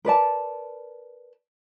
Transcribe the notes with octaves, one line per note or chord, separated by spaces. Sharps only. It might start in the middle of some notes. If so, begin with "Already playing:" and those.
A#4 B4 D5 A5